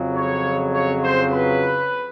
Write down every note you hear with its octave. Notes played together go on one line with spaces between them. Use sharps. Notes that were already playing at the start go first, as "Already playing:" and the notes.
Already playing: F2 C#3 F#3
C#5
C#5
C5
B4